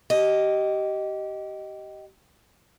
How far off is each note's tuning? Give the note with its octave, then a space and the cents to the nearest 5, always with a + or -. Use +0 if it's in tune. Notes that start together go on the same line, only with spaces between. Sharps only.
G4 -25 D#5 +0